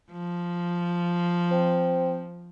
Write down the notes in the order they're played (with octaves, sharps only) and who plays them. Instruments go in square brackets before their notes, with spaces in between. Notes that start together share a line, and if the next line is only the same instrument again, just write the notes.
[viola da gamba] F3
[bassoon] C4